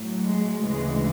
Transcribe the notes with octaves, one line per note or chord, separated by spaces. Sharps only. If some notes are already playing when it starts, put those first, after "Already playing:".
Already playing: A2 F#3
G#3
D2 C#3 E3 G#3